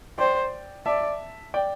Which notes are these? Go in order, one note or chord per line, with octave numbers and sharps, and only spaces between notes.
C5 D5 G5
D5 E5 A5
D5 G5